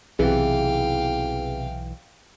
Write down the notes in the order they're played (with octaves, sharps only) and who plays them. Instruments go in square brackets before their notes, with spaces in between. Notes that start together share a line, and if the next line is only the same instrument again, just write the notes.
[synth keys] B1 E3 [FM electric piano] C3 [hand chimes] G#4 [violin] F5 G5